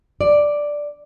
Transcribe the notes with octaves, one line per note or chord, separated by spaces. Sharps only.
D5